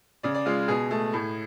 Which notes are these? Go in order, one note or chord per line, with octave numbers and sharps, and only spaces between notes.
C#3 D5
D5
G#3 F4
B2 G#4
A3
A2